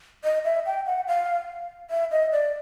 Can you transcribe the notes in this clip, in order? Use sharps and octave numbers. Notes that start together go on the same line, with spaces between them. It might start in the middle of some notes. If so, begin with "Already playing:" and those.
D#5
E5
G5
F#5
F5
E5
D#5
D5